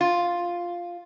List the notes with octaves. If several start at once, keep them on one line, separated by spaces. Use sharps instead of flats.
F4